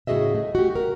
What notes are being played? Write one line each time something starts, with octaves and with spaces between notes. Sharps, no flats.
A2 C#3 F#4 G#4 D#5 E5
A3
F#4 G4
A#4